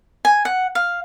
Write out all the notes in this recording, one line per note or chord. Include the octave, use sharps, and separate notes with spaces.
G#5
F#5
F5